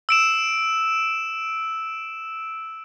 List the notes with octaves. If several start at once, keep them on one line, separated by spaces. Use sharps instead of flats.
E6 D7 E7